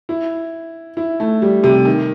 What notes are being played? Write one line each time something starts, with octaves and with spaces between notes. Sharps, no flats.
E4
E4
A3
G3
C3
D#3